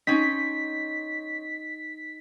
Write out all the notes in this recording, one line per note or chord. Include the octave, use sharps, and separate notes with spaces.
C4 C#4 D#4 B6